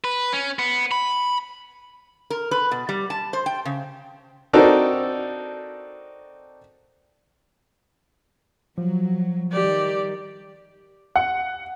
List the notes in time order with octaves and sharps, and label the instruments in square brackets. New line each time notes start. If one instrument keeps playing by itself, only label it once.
[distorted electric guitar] B4
C#4
B3
B5
[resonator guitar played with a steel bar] A#4
B4
B2
G3
A5
C5
G5
C#3
[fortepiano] C4 D4 D#4 F#4 A4 A#4
[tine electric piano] F3 [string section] F#3
[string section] D#3 G3 [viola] G4 D5
[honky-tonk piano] F#5